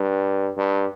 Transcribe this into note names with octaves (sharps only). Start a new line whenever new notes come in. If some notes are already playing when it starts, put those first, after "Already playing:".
Already playing: G2
G2